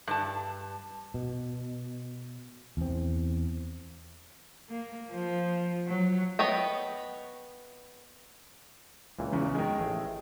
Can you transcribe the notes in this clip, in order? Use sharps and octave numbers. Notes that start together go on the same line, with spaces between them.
G2 A5
B2
E2 C4
A#3
F3
F#3
B3 C#5 D#5 G5
C#2 A#2 E3
E2 C#3
D#3 G#3 A#4 G#5
A1 A3 G#4